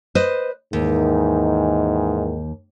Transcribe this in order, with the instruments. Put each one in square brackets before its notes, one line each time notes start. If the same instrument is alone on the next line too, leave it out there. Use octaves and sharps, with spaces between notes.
[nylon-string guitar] B4 C5 D#5
[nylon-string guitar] D#2 [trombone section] G#2 D#3 E3